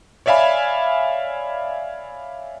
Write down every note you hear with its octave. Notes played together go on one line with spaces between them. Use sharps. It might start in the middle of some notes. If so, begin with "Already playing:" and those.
C#5 D5 E5 F5 G#5 B5